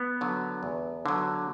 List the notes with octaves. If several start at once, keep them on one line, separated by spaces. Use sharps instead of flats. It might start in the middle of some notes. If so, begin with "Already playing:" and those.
Already playing: B3
D3 F#3
E2
D3 F#3